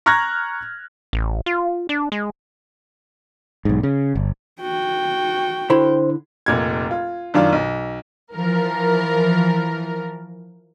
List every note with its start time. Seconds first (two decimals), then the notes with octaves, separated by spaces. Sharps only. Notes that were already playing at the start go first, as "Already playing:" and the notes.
0.06 A#5 C#6 F6 F#6 G#6 A#6
1.13 A1
1.46 F4
1.89 D4
2.12 G#3
3.65 B1 G#2
3.83 C#3
4.15 G1
4.61 F#4 G5
5.70 D3 E4 C5 B5
6.46 F1 A#2 G#6
6.91 F4
7.34 F#2 D#3 D4 F4
7.52 B1
8.34 E3 F3 A#4